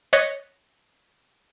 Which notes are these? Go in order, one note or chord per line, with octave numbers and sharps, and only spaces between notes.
C#5 D#5 F#6 A6 B6 C#7